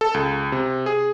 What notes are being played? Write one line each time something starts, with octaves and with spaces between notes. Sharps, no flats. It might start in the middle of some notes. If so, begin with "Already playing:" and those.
A4
C#2
C3
G#4